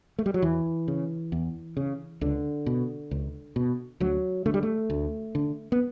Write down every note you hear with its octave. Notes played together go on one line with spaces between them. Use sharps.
A3
G3
F#3
E2 E3
C#3
E2
C#3
C#2 D3
B2
C#2
B2
D2 F#3
D3 A3
G3
A3
D2
D3
B3